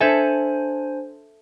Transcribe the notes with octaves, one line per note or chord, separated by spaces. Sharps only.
D4 A4 C5 E5 G#5 G#6